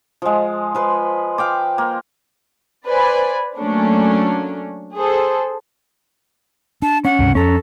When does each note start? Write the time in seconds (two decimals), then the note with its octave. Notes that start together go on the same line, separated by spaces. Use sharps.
0.22 F3 G#3
0.75 F3 B4 C6
1.38 F5 G5 D6
1.78 A#3
2.87 B4 C5 D5 G#5 B5
3.57 F#3 A3 A#3 C#4 D4
4.97 G#4 A4 C5
6.82 D4 A5
7.05 C#4 F#5
7.19 C#2 G2 C3
7.35 F2 C#4 A4 A#5